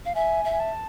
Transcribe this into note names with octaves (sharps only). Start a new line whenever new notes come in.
F5
E5 G#5
E5
G#5
A5